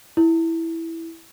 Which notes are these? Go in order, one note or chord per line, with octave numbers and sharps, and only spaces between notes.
E4